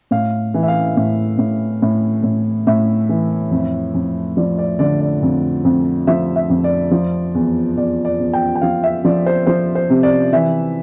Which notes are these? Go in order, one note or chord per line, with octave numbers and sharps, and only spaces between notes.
A2 F5
E3
E5
F5
A2
A2
A2
A2
A2 E5
E3
F2
F2
F3 D5
D5
D3 D5
D5
F2
F2
F3 E5
E5
F2
D5
F3
E2
E2 D5
D5
E2
G5
G5
F3 F5
E5
F3 D5
C5
F3 C5
C5
C3
D5
E3 E5